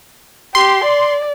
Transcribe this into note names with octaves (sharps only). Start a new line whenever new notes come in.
G4 C6
D5